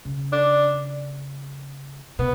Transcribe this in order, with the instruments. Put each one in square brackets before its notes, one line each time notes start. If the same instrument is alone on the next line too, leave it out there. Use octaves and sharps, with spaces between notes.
[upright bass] C#3
[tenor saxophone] D4
[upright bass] B2 [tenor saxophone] B3